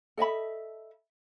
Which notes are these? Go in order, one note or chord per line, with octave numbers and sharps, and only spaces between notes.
A4 D#5 E5 B5